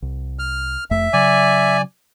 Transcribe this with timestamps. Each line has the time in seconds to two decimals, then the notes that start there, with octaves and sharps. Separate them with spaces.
0.02 C2
0.39 F6
0.91 F1 F2 A3 E5
1.13 C#3 F#3 D5 G#5